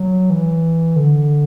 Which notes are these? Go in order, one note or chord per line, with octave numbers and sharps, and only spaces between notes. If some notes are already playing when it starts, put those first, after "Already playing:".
Already playing: F#3
E3
D3